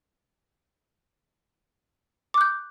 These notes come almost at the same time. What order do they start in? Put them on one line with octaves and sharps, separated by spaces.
D6 F#6 G6